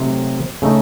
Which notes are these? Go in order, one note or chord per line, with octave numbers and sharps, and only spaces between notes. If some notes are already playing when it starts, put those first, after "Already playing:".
Already playing: C3 F#3 A3 C4 D#4
C#3 A3 D#4